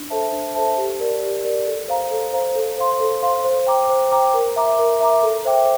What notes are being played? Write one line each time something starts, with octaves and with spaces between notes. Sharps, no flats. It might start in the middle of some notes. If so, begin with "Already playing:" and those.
Already playing: D4
A4 C5 E5 A5
D4
A4 C5 E5 A5
G4
A#4 D5
G4
A#4 D5
A4
C5 F5 A#5
A4
C5 F5 A#5
A4
C5 F5 C6
A4
C5 F5 C6
C5
G5 A#5 D6
C5
G5 A#5 D6
A#4
E5 A#5 D6
A#4
E5 A#5 D6
A4
C5 E5 G5 D6